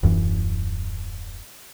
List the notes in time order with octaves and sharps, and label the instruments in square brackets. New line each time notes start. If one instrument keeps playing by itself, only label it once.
[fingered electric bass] D#1 F#2 E3